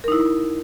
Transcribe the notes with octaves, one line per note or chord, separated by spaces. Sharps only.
D#4 E4 A#4